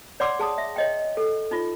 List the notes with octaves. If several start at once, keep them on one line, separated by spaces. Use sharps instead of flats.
C#5 D5 F#5 C6 D6 E6
G#4 A5 D#6
E5
C#5 D#5 G5
A4
D#4 F4